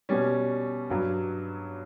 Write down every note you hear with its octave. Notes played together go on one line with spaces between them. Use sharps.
B2 G3 C#4
G2 F#3